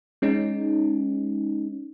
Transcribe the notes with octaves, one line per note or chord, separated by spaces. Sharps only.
G#3 C#4 D#4